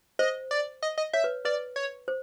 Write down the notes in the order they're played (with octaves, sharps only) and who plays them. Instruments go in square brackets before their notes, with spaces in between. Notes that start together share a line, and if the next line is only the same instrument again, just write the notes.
[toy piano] C5 [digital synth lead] D#5
[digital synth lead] D5
D#5
D#5
[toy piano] C#5 [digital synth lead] E5
[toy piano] B4
[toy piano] B4 [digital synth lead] D5
[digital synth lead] C#5
[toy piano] C5